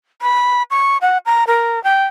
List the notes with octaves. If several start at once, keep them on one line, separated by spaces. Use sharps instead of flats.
B5
C#6
F#5
A#5
A#4
G5